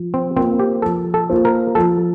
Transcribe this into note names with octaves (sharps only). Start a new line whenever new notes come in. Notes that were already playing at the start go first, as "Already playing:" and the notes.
Already playing: F3
C4
A#3 C4 F4 C5
G4
F3 A4
A4
A#3 F4 C5
A#4
F3 A4